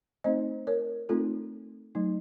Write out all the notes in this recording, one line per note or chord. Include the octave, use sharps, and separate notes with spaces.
A3 C4 D#4 C5 D#5
A#4 C#5
A3 C4 D#4 F4 A4
F#3 A3 D#4